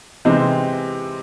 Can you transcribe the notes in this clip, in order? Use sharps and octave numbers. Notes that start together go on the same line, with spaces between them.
C3 E3 G#3 C4 D#4